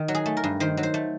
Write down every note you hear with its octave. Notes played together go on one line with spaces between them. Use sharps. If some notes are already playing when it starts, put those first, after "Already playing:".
Already playing: D#3
F#3
G#4
A3
A#4
G2
D#3 C5
F#3
C5
A3